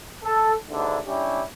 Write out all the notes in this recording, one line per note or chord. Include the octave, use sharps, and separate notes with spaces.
A4
D#2 G#2 D3 D4 E4
G3 C#4 D4 E4 G4